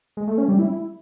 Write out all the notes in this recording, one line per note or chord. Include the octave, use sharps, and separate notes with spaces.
G#3
A3
C#4
G3
E4